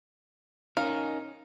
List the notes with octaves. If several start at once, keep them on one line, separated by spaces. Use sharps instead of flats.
C#4 D#4 A#4 F5